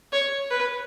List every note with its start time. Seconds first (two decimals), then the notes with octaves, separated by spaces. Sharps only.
0.13 C#5
0.50 B4